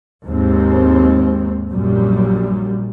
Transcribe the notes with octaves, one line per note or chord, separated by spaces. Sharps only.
D#2 G#2 C4
A#1 F#2 A#2 G3